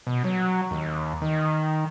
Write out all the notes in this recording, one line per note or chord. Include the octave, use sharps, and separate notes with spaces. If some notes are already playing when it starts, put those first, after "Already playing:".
B2
F#3
D#2
D#3